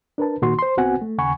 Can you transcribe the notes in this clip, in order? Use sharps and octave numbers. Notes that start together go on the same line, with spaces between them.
D4 A#4 B4 A5
A#2 D#3 F#4 C6
C5 C6
C2 B3 C4 F#4 F#5 G#5
A3
D#2 C#3 F#5 G#5 B5 C#6